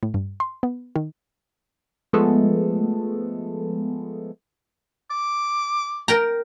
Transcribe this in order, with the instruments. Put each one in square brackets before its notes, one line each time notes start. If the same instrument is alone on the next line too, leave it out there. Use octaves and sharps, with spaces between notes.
[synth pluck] A2
G2
C6
B3
D#3
[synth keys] F3 G#3 A3 B3 A4
[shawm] D6
[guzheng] A#4 G5 A#5